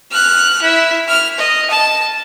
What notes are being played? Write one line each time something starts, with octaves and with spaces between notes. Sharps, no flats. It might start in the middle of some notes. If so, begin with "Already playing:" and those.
F6 F#6
E4
F6
D#5
A5